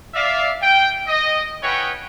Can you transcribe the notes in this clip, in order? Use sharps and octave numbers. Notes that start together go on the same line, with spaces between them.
D5 E5 F5
G5
D#5
E4 G#4 B4 C#5 F#5 G5